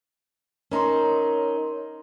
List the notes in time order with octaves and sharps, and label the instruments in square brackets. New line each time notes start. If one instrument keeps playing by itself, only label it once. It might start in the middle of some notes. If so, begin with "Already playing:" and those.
[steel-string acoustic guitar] C#4 D#4 [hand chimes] A#4 A#5 C6